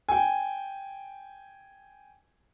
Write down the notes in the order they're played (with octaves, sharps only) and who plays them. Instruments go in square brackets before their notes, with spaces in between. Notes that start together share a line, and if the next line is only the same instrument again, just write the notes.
[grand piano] G5 G#5